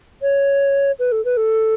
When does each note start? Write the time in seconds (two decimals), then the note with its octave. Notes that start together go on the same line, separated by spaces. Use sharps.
0.22 C#5
0.99 B4
1.12 A4
1.25 B4
1.37 A4